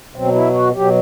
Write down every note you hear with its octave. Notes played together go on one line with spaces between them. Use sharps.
B2 F#3 C4
E4
F#4
B2 F#3 G4